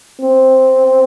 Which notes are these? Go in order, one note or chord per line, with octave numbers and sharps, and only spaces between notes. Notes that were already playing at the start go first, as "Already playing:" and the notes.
C4